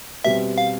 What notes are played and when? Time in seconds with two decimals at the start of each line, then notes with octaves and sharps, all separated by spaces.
0.24 B2 G3 C4 E5
0.58 F5